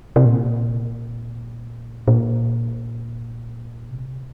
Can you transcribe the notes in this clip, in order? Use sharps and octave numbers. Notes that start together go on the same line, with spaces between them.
C3
A#2
A#2
C3